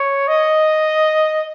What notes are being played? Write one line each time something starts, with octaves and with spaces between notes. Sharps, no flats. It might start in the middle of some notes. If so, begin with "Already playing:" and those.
Already playing: C#5
D#5